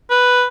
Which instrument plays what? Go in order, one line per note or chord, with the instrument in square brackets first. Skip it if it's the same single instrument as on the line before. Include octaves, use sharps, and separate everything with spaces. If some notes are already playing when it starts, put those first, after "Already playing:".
[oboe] B4